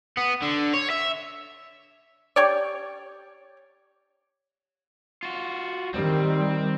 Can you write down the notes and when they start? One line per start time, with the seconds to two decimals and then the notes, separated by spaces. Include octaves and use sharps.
0.17 B3
0.42 D3
0.74 C#5
0.90 E5
2.36 G4 C#5 D5
5.23 F4 F#4
5.94 D#3 G3 C4